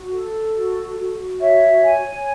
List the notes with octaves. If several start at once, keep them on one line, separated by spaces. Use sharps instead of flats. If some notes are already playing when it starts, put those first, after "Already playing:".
Already playing: F#4
A4
F#4
F#4
C#5 E5
G#5